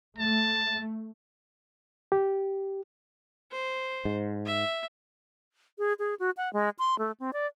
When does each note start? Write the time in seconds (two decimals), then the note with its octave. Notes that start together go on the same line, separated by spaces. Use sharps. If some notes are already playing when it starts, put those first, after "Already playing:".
0.18 A3 A5
2.12 G4
3.52 C5
4.05 G#2
4.46 E5
5.79 G#4
5.99 G#4
6.20 F#4
6.37 F#5
6.53 G#3
6.79 C6
6.99 A3
7.20 C4
7.33 D5